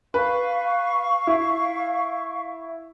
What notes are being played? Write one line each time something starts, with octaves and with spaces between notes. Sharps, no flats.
B4 F5 C#6
E4